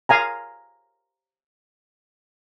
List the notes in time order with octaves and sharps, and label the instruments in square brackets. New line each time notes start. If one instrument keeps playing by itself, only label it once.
[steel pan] F5 G#5 A#5